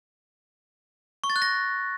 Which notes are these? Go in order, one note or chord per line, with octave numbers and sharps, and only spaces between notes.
C#6
A6
F#6
A#6